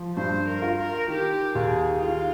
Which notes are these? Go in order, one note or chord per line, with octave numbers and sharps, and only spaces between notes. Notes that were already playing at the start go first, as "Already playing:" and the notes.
Already playing: F3
G2 C5
A#4
F4
A#4
D#3 G4
D#2 G#4
D#3 F4